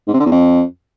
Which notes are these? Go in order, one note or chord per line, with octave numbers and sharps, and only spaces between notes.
G#2
C3
D3
E2
F2